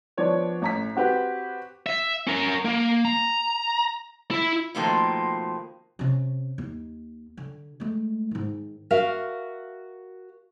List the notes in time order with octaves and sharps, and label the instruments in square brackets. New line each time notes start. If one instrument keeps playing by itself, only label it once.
[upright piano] F3 B3 D4 C#5 D5
A1 A#5 B6
C4 F#4 G4 B4
[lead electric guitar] E5
C#4 A#4
A#3
A#5
E4
[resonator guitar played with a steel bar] B2 D#3 F3 A3 A#3 C4
[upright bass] C3 C#4
D#2
D3
G#3 A3
G#2 D#3
[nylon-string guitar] F#4 A#4 E5 F5